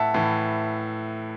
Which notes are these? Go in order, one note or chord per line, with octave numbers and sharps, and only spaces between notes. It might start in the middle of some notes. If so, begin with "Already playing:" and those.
Already playing: A2 E3 E5 F#5 A5
A2 E3